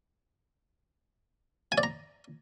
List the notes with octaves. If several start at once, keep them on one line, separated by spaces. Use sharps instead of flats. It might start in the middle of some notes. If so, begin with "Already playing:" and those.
G#5
D5
A#5